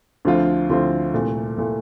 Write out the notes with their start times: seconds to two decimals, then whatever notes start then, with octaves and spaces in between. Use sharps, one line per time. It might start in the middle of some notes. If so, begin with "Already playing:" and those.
0.25 D2 D3 F3 C4 F4
0.70 D2 D3 F3 C4 F4
1.14 C2 A#2 A3
1.58 A#2 A3